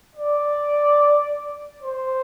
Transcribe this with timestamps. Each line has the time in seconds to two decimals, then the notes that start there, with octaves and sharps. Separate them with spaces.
0.16 D5
1.83 C5